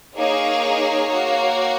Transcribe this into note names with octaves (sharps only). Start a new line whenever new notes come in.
A#3 D#4 G#4 C#5
A#3 F#4